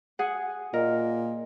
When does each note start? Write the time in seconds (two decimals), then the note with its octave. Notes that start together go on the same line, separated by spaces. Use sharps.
0.19 G#4 F#5
0.74 A#2 A#4 D#5